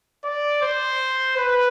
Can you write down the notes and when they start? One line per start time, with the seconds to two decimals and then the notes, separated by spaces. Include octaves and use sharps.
0.24 D5
0.62 C5
1.37 B4